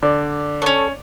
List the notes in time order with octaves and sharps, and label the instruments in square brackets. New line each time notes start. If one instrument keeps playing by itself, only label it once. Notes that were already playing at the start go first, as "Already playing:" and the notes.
[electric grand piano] D3 [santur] D5
[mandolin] B3 C#4 [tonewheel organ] A4 C#5